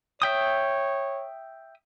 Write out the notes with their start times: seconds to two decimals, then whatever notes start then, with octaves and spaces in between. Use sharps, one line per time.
0.22 C#5 E5 G5 D#6